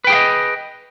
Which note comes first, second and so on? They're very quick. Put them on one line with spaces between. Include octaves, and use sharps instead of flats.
B4 G5 G#4 F5 D#5